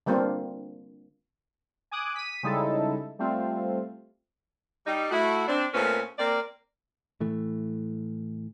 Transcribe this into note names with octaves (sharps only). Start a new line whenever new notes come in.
D3 G3 A#3 C4 D4 F4
G#5 D6 D#6 F#6
B6 D#7
C#3 G3 G#3 D#4 E4 A4
G3 A3 C4 F4
G3 D#4
A3 E4 F#4
C4 D4
A#2 A3 C4 C#4 A#4 B4
A#3 C4 A#4 D5
A2 E3 A3